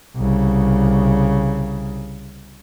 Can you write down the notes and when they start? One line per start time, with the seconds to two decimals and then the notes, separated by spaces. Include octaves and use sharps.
0.16 C2 C#3